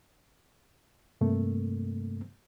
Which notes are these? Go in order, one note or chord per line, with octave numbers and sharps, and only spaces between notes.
G2 C3 A3 A#3